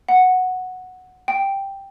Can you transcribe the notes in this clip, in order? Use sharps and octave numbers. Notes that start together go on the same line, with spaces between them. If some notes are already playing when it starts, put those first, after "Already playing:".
F#5
G5